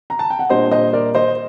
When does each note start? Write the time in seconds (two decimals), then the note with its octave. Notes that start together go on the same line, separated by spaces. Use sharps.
0.10 A#5
0.19 A5
0.30 G5
0.39 F#5
0.50 A#2 G3 D4 C5 D#5
0.71 C5 D#5
0.93 A#4 D5
1.15 C5 D#5